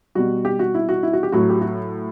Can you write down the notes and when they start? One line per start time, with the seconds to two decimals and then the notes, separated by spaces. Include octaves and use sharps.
0.15 B2 G3 F#4
0.45 G4
0.59 F#4
0.74 E4
0.89 F#4
1.03 E4
1.13 F#4
1.23 G4
1.32 A2 F#3 F#4
1.49 G4
1.61 F#4